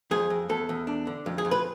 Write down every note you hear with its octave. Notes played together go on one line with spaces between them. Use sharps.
F2 G#4
F2
E2 A4
E2
D4
D3
F2
G#4
F2
B4